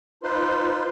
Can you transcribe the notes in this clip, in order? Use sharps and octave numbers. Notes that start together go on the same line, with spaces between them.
D#4 F4 B4 C5 C6